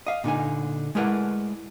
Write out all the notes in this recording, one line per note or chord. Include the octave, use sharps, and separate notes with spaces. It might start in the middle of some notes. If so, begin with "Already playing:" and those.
D#5 F5
A#2 D3 D#4 G#5
G#3 A3 E4 A#4 B4 F#5